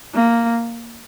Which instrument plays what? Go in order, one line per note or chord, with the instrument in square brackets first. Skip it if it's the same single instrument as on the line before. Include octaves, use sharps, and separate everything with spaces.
[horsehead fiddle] A#3